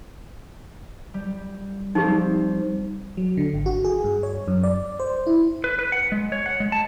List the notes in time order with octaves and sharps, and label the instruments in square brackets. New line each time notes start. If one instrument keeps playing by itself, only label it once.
[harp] G3
[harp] F3 G3 C4 [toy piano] D#4 G4
[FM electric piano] F#3
D3
G#1
F#4
G#4
G2
C#5
F#2
D5
C5
E4
[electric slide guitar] B4
B4
F#5
G#3
C#5
F#5
G#3
A5